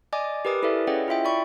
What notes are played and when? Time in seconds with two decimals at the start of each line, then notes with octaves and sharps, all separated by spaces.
0.13 D5 D#5 G#5 D6
0.45 G4 A#4 B4 D6 D#6
0.62 E4 A4 B4 D5 E5
0.87 C#4 G#4 C#5 D#5 F#5 G5
1.08 E4 F4 E5 G5
1.25 D5 B5 C#6